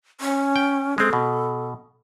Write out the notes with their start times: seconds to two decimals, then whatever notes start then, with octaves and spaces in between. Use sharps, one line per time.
0.21 C#4
0.56 G5
0.98 G#3 C4 A4
1.13 B2